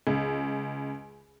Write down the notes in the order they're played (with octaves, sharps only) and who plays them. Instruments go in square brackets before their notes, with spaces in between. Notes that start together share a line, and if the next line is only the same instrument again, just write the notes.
[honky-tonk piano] C#2